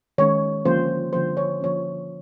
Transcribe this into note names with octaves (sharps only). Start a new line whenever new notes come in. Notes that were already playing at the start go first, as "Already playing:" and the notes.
D#3 G#3 C#4 C#5
D3 F3 A#3 C#4 C5
D3 F3 A#3 C#4 C5
C#5
D3 F3 A#3 C#4 C#5